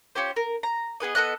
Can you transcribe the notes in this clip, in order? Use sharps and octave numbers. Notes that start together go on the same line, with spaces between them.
C#4 F4 G4 C5
A#4
A#5
B3 G#4 B4 D#5
B3 A4 D#5 F#6